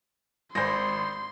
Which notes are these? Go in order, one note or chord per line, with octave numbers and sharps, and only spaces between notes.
G#1 C5 C6 A#6